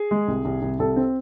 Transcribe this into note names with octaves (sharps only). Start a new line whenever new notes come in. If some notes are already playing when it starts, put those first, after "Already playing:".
Already playing: G#4
G#3
C2
C2
C2
C2 A4
C4